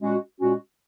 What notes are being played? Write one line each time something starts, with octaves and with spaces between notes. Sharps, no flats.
A#2 G#3 C#4 F#4
A#2 G#3 C#4 F#4